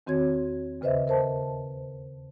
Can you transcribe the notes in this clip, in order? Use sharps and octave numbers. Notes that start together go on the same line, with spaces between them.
E2 D#3 C4 F#4 C#5 G#6
D#2 C#3 B4 C5 D#5 E5
A#4 C5 A5